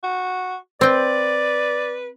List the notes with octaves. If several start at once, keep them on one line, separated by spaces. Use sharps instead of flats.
F#4
C4 B4 D5 G5